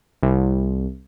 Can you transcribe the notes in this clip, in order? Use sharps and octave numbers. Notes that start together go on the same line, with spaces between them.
C2